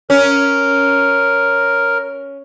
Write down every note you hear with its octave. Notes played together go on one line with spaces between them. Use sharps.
C#4 A#4